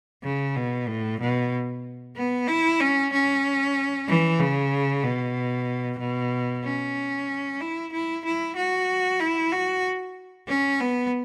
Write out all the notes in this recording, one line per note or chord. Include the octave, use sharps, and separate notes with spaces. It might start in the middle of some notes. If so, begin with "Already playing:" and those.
C#3
B2
A2
B2
B3
E4
C#4
C#4
E3
C#3
B2
B2
C#4
E4
E4
E4
F#4
E4
F#4
C#4
B3